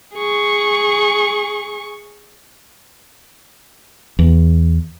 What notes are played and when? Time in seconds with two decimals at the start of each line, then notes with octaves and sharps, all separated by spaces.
0.15 G#4 C#6
4.19 E2